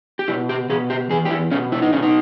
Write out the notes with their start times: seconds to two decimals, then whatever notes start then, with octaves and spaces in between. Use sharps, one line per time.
0.19 G4
0.28 B2 E4
0.49 G4
0.69 B2 G#4
0.90 G4
1.10 E2 G#4
1.25 G4
1.31 E4
1.51 B2 C#4
1.72 E4
1.82 D#4
1.93 B2 C#4
2.02 D#4